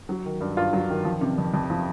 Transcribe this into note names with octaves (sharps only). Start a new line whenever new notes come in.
F#3
D#3
G2
G2 F4
F#3
D#3
F3
C3
F2
F2
F3